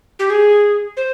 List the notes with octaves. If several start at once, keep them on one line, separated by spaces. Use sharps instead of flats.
G4
G#4
C5